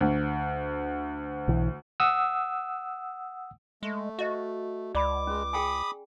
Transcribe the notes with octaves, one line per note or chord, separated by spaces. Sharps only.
D2
B1 E3
F#5 D#6 E6
G#3 A3
F#4 C5 D#5 F5
C#2 D5 B5 D6
G#3 C#4
G#4 G5 G#5 B5 D#6